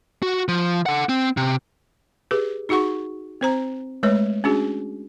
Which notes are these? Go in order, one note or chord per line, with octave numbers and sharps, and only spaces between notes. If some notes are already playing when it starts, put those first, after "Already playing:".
F#4
F3
A4 F#5
C4
C3
G4 G#4 B4
D#4 F#4 G#4 F#5 C#6
C4 C5 A#5
G#3 A3 B4 C#5
C#4 D4 F#4 G#4